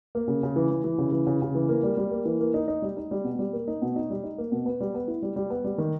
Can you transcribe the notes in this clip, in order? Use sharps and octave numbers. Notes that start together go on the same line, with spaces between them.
A#3
C#3
C#3
E3
E3
E3
C#3
E3
C#3
C#3
E3
A#3
G3
G3
A#3
E3
A#3
D#4
D#4
G3
D#4
G3
B2
G3
A#3
D#4
B2
D#4
G3
D#4
A#3
B2
B3
G3
B3
E4
G3
G3
B3
G3
D#3